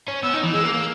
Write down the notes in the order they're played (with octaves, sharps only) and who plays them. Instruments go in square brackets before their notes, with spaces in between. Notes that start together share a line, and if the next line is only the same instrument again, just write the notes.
[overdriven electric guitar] C#4
[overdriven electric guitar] B3 [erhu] E6
[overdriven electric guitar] D#4
E3
[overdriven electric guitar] G#3 [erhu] E6
[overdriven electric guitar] A#3
A#3